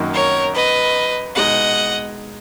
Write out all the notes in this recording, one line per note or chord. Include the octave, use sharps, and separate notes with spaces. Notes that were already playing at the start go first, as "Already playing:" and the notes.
Already playing: F#2 D#3 F#3 A#3 D#4
A#4 C#5
B4 D#5
B2 G#3 D#4 D#5 F#5